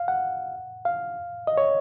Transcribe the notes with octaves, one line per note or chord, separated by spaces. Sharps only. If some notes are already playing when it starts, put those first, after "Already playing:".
Already playing: F5
F#5
F5
D#5
C#5